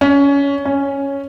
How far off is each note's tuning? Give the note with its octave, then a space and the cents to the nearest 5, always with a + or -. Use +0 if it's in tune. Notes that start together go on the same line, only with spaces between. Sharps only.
C#4 +20
C#4 +0